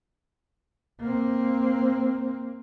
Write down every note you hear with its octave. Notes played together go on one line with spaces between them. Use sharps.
A#3 C4